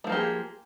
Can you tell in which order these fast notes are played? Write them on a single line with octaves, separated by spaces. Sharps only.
A3 F3 A#3 G4 G#4